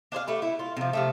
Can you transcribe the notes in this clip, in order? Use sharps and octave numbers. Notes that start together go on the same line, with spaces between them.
D4 G#4 C5 F5
A3 G4 B4
E4
F4
C3 F3
C3 F3 A3